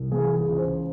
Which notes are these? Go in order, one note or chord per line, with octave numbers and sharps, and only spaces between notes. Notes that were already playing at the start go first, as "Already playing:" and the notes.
Already playing: C2
E3 G#4
G#4
C#2
C5